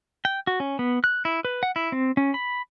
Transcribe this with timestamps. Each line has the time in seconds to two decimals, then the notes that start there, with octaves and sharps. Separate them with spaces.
0.25 G5
0.47 F#4
0.60 C#4
0.79 B3
1.04 F#6
1.25 E4
1.45 B4
1.63 F#5
1.76 E4
1.92 C4
2.17 C#4
2.34 B5